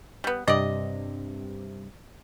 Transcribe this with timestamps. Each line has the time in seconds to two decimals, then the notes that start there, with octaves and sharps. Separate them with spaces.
0.24 G3 B3
0.48 G2 C3 D5 D#5